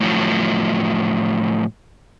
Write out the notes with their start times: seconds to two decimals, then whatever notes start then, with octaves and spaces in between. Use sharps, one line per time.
0.01 A2 F3 F#3